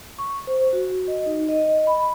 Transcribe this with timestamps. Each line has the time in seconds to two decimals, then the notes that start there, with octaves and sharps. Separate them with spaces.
0.19 C#6
0.47 C5
0.73 F#4
1.08 D#5
1.26 D#4
1.49 D#5
1.87 B5